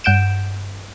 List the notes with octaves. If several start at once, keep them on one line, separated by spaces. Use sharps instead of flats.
G2 F#5 G6 D7 E7